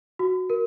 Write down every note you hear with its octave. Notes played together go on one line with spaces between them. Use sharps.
F#4
A#4